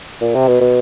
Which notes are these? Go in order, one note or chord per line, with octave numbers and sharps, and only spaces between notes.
A#2
C3
B2
B2